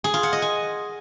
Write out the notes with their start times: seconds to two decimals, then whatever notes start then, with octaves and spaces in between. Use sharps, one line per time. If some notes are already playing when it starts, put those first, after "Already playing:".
0.04 G#4
0.14 F4
0.23 F#5
0.33 D#5
0.42 G#5